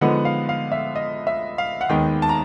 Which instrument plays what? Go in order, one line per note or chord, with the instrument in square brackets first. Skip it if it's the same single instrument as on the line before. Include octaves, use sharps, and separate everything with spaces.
[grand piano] D3 F3 G#3 B3 D#4 F#5
F5
F5
E5
D#5
E5
F5
F#5
D#2 D#3 G#3 B3 D#4 G5
A5
A#5